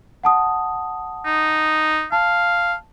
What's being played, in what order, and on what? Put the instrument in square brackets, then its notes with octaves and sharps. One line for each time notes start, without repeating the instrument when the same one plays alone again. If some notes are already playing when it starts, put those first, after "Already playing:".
[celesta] F#5 A5 D#6
[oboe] D#4
[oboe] F5 [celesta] A5